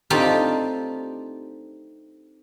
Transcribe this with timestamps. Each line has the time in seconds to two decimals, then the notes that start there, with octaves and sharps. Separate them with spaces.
0.10 A3 C4 D4 D#4 F4 G4